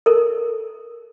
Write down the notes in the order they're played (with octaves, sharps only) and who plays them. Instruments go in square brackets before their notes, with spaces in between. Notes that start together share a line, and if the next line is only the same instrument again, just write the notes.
[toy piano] A4 A#4